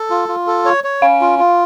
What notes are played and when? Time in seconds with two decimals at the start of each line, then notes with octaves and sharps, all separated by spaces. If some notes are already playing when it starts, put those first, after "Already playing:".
Already playing: A4
0.10 F4
0.29 F4
0.47 A4
0.65 C#5
0.84 C#5
1.02 C#4 F5
1.21 F4
1.39 F4